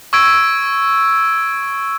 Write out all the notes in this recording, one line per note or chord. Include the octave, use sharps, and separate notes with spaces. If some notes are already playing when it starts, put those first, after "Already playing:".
C#6 E6 G#6 D7